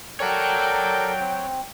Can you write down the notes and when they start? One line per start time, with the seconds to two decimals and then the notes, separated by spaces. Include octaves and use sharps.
0.20 A4 A#4 C#5 D5 F#5 G5
1.20 C4